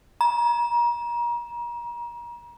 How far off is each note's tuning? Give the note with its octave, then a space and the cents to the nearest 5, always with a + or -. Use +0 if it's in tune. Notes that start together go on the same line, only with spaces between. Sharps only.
A#5 +35